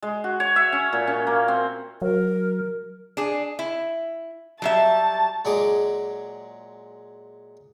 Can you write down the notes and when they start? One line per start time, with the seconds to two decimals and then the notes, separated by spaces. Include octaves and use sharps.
0.02 G#3
0.24 F#4
0.40 C#5
0.56 E5
0.72 C#4
0.93 A#2
1.07 C#4
1.27 A#3
1.48 C4
2.02 F#3 A#4
3.17 D4 G#4
3.59 E4
4.62 F#3 G3 E5 A5
5.45 A#2 F#3 G#3 G#4 D6